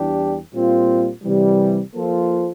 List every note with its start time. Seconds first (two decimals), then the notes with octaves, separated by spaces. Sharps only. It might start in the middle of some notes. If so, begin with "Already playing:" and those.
Already playing: E2 E3 G3 D4 G4
0.52 A#2 G3 C4 F4
1.23 C3 E3 G3
1.94 F3 A#3 F4 A4 C5